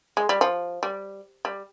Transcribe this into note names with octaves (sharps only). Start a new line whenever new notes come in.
G#3
G3
F3
G3
G3